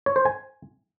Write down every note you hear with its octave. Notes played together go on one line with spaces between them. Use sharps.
C#5
C5
G#5